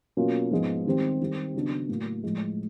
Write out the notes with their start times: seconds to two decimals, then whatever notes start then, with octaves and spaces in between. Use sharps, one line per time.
0.17 B2 F#3 A#3 C#4 F4
0.51 G#2 F3 G#3 B3
0.86 D#3 G3 C4
1.21 D#3 G3 C4
1.54 C#3 F#3 B3 D4
1.89 A2 F#3 A#3
2.23 A2 F3 G#3